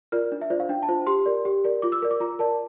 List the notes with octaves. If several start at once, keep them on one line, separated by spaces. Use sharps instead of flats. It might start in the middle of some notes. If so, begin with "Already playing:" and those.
F4 A#4 D5 F6
D4
E5
F4 C5 D5
F5
D4 G5
A5
F4 C5
G4 C6
A#4 D5
G4
A#4 D5
F4 D6
E6
A#4 D5
D6
F4 A#5
A#4 D5 A5